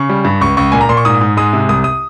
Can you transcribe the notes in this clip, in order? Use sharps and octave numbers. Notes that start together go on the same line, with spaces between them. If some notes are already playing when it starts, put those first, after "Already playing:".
Already playing: C#3 C#6
G3
G2
C#2 C#6
C#2 C#6
A#2 G#5
A#5
A#2 C6
C#6
G#2 D#6
G#2
G#3 D#6
C3
C2 D#6
D#6